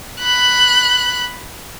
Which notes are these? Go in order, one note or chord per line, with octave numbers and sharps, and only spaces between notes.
B5 F#6